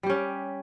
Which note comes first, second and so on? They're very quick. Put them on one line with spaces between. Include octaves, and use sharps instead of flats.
G3 G4 C#4